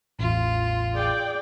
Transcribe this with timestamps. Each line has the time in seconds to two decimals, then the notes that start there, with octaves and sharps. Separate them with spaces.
0.19 A1 E2 F4
0.94 G#4 D5 G5